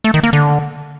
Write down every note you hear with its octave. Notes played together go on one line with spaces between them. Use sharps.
A3
D#3
A#3
D3